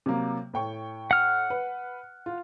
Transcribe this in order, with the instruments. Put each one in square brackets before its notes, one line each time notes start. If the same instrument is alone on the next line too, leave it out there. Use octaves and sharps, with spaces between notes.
[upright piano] C3 F#3 A#3
A2 G5 C#6
[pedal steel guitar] F#5 F6
[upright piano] B4
F4